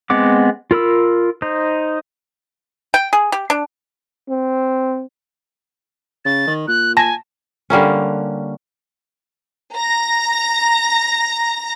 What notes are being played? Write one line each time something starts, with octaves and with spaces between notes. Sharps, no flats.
G#3 B3 C4 F#5 D6
F4 A#4 B5 E6
D#4 C5
G5
G#4
G4
D4
C4
C#3 A6
D#3
A#2 F#6
G#5 A5 A#6
D3 G3 A#3 C#4
A#5 A#6